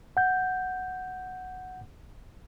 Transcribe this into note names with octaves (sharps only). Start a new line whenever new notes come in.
F#5 G6